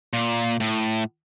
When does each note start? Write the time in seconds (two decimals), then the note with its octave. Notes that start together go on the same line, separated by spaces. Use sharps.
0.13 A#2
0.60 A2